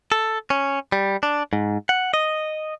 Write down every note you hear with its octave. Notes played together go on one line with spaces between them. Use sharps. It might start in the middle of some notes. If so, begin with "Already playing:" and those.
A4
C#4
G3
D4
G#2
F#5
D#5